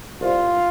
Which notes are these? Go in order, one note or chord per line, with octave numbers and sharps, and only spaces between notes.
C2 F4